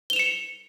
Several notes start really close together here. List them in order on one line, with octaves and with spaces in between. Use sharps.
G7 F7 E7 C#7